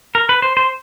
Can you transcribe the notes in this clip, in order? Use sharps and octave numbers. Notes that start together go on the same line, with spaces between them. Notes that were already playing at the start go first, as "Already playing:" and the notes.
A#4
B4
C5
C5